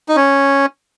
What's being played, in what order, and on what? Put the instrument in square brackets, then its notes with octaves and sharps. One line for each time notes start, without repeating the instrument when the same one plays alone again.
[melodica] D#4
C#4